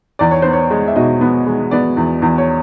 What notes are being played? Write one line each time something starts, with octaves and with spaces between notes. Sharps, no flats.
E2 D5
C#5
B3 C5
C#5
G#3
E5
B2 D#5
B3
G#3
B3 D5
E2
E2
C#5